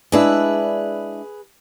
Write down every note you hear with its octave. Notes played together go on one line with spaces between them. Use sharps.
G#3 D4 E4 G#4 B4